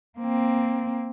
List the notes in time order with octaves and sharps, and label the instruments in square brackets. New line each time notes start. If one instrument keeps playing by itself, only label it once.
[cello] A#3 C4